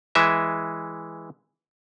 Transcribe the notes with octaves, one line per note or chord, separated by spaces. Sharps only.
E3 G#3 E5